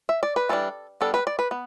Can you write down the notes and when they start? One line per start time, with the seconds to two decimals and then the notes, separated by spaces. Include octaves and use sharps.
0.09 E5
0.23 D5
0.36 B4
0.49 E3 G3 D4 A4
1.01 G3 B3 D4 A4
1.14 B4
1.27 D5
1.39 B4
1.51 B3